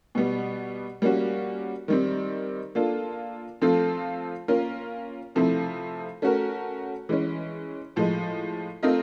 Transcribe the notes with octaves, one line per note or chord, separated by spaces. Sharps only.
B2 G3 B3
G3 A#3 C#4 F#4
D#3 G3 C4
A#3 D4 F4 A4
F3 A3 C4 F4 A4
A#3 C#4 F4 A#4
C3 F3 A3 C4 E4
A3 C#4 F#4 A#4
E3 G#3 C#4
A2 F3 G#3
A3 C4 F4 A#4 D#5